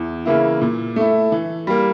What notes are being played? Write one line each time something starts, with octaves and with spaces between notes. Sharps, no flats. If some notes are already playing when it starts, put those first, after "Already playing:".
Already playing: E2
C#3 E3 A#3 E4
A#2
A3 E4
E3
G3 A#3